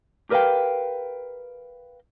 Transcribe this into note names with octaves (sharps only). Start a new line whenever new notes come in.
G4 A#4 B4 D#5 F5 G5